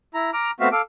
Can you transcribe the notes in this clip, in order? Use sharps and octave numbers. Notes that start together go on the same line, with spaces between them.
E4 A#5
A#5 D6 F6
A3 B3 C4 F#4 E5 F5
A4 F5 D6